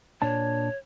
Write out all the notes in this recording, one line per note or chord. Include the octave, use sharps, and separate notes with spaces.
A#2 D4 C#5 A5